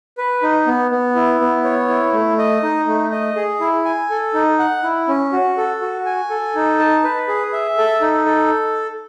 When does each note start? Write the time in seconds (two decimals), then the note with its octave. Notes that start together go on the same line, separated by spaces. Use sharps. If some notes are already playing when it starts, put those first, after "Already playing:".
0.18 B4
0.43 D#4
0.67 B3
0.91 B3
1.15 E4
1.40 B3
1.64 C#5
1.88 E4
2.13 A3
2.38 D#5
2.63 D#4
2.88 A3
3.12 D#5
3.36 G#4
3.60 E4
3.85 G#5
4.10 A4
4.34 D#4
4.59 F#5
4.83 E4
5.08 C#4
5.32 F#4
5.57 A4
5.81 F#4
6.06 G#5
6.30 A4
6.55 D#4
6.79 A5
7.04 B4
7.28 G#4
7.53 E5
7.77 A4
8.01 D#4
8.26 A4